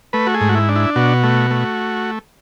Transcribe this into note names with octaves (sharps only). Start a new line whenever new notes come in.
A3 B4
F#4
G#4
G#2
F#4
E4
D4
E4
B2 F#4
A3
A3